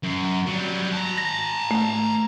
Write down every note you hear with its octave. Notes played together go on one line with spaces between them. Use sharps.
F#2
F#3 G3
A5 A#5
A#6
A3